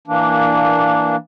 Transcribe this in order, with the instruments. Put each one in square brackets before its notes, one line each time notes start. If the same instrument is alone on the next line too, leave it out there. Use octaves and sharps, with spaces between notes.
[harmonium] E3 A#3 D4